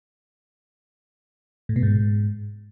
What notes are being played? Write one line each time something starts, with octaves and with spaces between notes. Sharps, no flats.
A2
B2
G#2